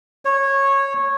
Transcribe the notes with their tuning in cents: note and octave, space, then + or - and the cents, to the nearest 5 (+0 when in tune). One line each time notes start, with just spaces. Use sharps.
C#5 -15